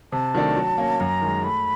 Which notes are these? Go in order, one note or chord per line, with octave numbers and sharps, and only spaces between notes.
C3 A5
D#3 F#3 A3 D4
F#3
A#3 C#4
F#2 A#5
D#3 G#3
A3 B5